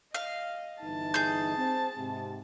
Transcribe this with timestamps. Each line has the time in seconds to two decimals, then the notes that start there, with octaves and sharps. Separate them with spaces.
0.14 D#5 F5
0.82 G1 E3 D#4 A5
1.14 G#4 G6
1.57 C4
1.98 G#2 C3